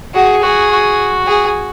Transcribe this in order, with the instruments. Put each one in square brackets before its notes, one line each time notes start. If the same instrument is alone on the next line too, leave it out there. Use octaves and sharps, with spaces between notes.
[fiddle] F#4 [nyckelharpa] G#4
[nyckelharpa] F#4 [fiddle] G#4
[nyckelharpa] F#4
[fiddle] G#4